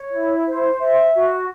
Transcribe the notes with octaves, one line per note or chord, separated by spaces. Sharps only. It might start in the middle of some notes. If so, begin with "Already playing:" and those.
Already playing: C#5
E4
C5
E5
F#4